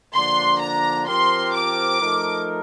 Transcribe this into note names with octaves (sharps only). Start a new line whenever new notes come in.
D3 F3 A#3 D4 C6
A#5
F3 C4 G4 A#4 C6
D6
F3 A3 D#4 A#4